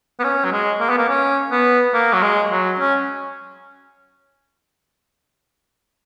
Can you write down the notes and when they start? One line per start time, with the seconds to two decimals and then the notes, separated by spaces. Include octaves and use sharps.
0.19 B3
0.24 C#4
0.44 F#3
0.52 G#3
0.80 A#3
0.89 B3
0.98 A#3
1.09 C#4
1.51 B3
1.94 A#3
2.13 F#3
2.22 G#3
2.51 F#3
2.79 C#4